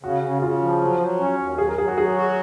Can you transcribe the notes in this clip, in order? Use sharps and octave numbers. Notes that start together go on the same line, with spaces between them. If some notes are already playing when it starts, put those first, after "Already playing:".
C#3 F#4
C#3
C#3 F4
F3
F#3
F#3
C#4 F#4
D#2
F#3 G#4
A#4
F#3 G#4
F#4
F#3 G#4
F#4